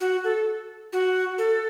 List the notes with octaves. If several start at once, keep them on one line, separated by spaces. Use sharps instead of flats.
F#4
A4
F#4
A4